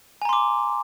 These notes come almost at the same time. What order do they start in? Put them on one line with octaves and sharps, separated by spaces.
G#5 A#5 C6 D6